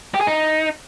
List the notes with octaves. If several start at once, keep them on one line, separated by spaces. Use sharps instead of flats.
G4
G#4
D#4